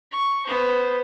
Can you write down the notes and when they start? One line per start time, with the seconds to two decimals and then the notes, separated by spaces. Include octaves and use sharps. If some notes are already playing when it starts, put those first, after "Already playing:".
0.12 C#6
0.46 B3 C5